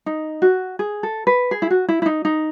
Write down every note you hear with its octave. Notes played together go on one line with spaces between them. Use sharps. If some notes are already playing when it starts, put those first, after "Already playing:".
D#4
F#4
G#4
A4
B4
G#4
E4
F#4
E4
E4
D#4
D#4